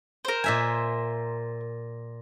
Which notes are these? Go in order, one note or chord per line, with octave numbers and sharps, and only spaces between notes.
A#4 C5
A#2 E5 G#5